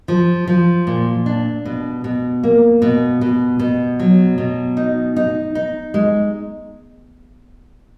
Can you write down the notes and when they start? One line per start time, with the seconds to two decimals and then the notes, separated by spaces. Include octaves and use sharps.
0.08 F3
0.47 F3
0.87 A#2
1.26 D4
1.65 B2
2.04 B2
2.43 A#3
2.82 B2
3.21 B2
3.59 B2
3.99 F#3
4.38 B2
4.77 D#4
5.16 D#4
5.55 D#4
5.94 G#3